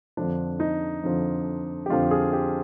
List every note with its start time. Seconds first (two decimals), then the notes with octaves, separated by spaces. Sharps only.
0.17 F2 D3 F3 D4
0.60 D#4
1.03 F2 D3 F3
1.86 G4
1.90 F2 D3 F3 F4
2.11 G#4
2.33 G4